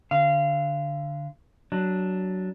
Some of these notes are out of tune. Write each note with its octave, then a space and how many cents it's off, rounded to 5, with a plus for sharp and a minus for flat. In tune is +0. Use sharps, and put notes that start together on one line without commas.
D3 +0 F5 -25
F#3 +15 D4 +0